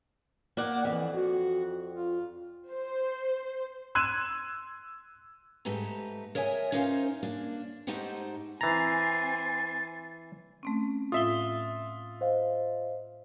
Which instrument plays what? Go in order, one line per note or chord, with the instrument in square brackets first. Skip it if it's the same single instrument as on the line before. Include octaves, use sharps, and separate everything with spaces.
[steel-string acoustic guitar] A#3 D5 F#5
[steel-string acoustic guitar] F2 [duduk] E3
[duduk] F#4
F4
[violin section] C5
[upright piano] C6 E6 F#6 G#6 D#7 E7
[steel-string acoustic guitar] G#2 A3 G4 B4 A#5
A#4 C#5 D#5 E5 G#5
C#4 D#4 F4 A#4 C5 F5
A#3 D4
G#2 A3 D#4 G4 C5 F#5
[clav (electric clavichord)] E3 A#5 [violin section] C4 G#5 C7 [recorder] A6
[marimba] A3 C4 C#4
[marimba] A2 [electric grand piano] F4 E5 [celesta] D#6 G7
[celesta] C5 D#5 F5